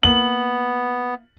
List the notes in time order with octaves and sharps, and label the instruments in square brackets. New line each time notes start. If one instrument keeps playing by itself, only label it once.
[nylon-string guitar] A#3 E4 [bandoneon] B3 [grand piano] F#7